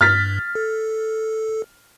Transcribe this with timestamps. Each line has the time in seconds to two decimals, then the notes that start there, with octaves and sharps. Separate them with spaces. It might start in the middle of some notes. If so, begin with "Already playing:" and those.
0.01 G2 F6 A6 B6
0.55 A4